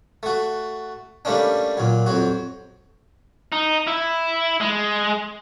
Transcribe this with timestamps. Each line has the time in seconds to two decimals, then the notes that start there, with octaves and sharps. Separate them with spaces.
0.23 A3 F#4
1.25 G3 A3 A#3 C#4 D4
1.77 A#2 F#3
2.06 F2 F#3 F#4
3.52 D#4
3.87 E4
4.61 G#3